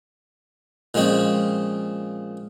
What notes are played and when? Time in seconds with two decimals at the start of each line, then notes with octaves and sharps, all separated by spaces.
0.94 A#2 F3 G#3 C4 C#4